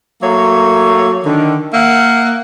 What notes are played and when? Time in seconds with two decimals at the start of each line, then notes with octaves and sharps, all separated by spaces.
0.23 F#3 A3 A#3 A4 C#5
1.25 D3 D#3
1.73 A#3 A#4 E5 F#5